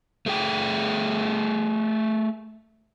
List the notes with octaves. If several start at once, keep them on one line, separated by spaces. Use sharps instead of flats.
A3 G#4 G5